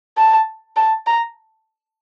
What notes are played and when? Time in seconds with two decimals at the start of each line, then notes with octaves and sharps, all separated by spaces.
0.18 A5
0.76 A5
1.07 A#5